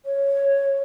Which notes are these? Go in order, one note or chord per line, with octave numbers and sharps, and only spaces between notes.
C#5